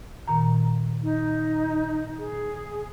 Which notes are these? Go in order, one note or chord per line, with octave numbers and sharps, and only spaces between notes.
A#2 D#3 A#5
D#4
G#4